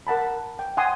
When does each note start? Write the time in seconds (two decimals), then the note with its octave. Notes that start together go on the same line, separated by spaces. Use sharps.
0.07 A#4 F#5 A5 B5
0.59 G5
0.77 F#5 G#5 C6 D#6